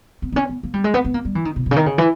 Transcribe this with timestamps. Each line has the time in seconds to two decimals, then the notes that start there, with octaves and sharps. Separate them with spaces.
0.22 B3
0.32 B3
0.36 C#4
0.49 B3
0.63 A#3
0.74 G3
0.84 G#3
0.94 B3
1.05 B3
1.14 A#3
1.25 G3
1.35 E3
1.45 D#3
1.56 B2
1.66 B2
1.71 C#3
1.76 D#3
1.86 C#3
1.98 E3